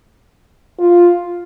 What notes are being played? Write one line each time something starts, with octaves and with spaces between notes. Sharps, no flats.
F4